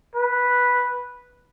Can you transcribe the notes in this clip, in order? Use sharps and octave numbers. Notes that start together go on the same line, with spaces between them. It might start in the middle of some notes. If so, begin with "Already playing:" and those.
B4